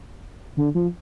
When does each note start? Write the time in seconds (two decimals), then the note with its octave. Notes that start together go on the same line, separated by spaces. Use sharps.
0.57 D3
0.75 F3